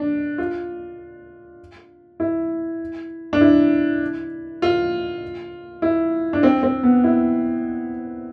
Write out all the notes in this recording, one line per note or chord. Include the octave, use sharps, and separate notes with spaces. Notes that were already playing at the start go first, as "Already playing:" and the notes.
Already playing: D4
F4
E4
D4
E4
F4
E4
D4
C4
C4
B3
E4